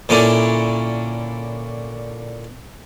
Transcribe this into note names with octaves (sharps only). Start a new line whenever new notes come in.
A#2 D3 C#4 D4 E4